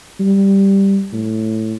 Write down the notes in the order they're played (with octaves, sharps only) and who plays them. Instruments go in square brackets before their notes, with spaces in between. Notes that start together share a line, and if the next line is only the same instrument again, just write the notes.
[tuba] G3
A2